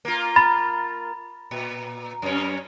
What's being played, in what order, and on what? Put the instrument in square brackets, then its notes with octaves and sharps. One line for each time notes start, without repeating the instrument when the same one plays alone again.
[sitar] A#3 F4
[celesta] B5 A6
[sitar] A#2
F#2 C#4